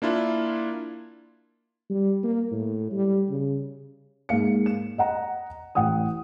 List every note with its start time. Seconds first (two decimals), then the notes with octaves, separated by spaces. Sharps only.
0.02 A#3 D4 E4 F4
1.89 G3
2.23 A#3
2.51 A2
2.92 G3
3.29 C#3
4.29 G#2 A#3 F5 C#7
4.66 E7
4.98 D#5 F#5 A#5
5.75 A1 F#5 G5 D#6